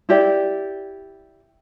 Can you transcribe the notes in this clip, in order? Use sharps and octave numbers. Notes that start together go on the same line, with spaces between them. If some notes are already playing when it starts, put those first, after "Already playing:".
E4 G4 D5